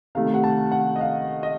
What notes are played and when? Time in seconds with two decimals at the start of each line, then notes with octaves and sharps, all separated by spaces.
0.15 C3 D#3 A3 F5
0.34 F#5
0.44 A5
0.72 F#5
0.96 D#5
1.01 F5
1.43 D#5